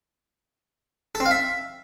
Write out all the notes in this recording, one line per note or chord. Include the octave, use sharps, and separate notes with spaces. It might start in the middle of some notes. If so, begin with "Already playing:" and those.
A4
C4
F5
E5